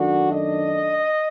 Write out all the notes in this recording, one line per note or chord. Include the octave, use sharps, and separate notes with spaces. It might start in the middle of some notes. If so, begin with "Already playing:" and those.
Already playing: F#2 D#3 A3 D4 F#4
D#5